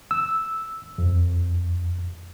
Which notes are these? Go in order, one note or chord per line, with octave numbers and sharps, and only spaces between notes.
E6
F2